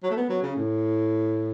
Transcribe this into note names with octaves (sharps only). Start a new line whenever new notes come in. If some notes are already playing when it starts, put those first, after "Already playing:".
F#3
A3
B3
F#3
C#3
A2